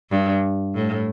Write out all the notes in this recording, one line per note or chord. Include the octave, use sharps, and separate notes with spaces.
G2
A2